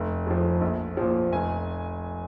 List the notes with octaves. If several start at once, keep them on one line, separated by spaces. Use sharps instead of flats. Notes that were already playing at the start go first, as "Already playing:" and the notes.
Already playing: F1
F2 F3
A#1
A#2 F3
F1 G#5